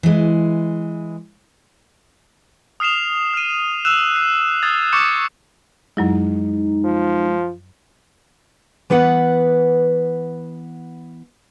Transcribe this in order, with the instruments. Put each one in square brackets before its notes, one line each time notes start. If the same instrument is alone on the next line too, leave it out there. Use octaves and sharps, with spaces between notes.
[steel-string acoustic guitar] E3 G#3
[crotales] D#6 F6 C7 E7 F7
F6 D#7
E6 F#6 E7 F7
C7
D#6 F6 G#6 A6
C#6 D6 G6 A6 C#7 E7
[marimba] F#2 F#3 E4 [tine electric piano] G#3 [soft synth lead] D#4
[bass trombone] F3
[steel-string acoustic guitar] E3 B3 B4 F#5